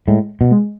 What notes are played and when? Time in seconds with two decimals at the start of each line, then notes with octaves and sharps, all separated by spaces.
0.07 A2 G#3
0.41 B2
0.51 G#3